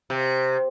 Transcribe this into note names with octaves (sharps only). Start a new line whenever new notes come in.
C3